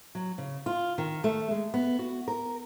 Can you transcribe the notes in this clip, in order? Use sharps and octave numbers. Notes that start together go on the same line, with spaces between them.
F#3
C#3
F4
D#3
A3
G#3
B3
F#4
A#4